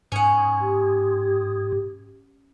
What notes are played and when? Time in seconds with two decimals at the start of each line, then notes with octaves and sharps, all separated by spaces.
0.12 G#2 C#4 F#5
0.61 G4